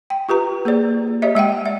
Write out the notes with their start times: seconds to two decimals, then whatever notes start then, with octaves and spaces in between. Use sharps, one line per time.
0.10 G5
0.29 F4 G4 B4 A#5
0.65 A#3 G#4 C5 D5
1.22 G4 C#5 D#5 E5
1.35 G#3 E5 F#5 G5
1.66 D5 E5